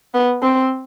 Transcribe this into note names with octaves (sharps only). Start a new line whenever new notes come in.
B3
C4